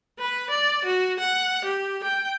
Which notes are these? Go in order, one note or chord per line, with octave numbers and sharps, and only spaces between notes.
B4
D5
F#4
F#5
G4
G5